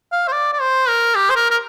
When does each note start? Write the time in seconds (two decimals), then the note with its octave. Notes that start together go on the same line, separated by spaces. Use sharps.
0.12 F5
0.28 C5
0.33 D5
0.53 D5
0.61 C5
0.89 A#4
1.16 G4
1.30 C5
1.36 A#4
1.51 A#4